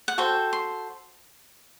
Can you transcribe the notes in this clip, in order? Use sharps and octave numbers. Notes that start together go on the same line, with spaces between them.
F#5
F#4 A4 C5 G5
C6